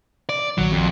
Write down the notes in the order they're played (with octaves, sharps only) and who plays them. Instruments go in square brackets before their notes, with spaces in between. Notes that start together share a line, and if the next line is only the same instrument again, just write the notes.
[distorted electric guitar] D5
[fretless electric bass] A#1 D#3 [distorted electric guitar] F#3
[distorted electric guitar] F2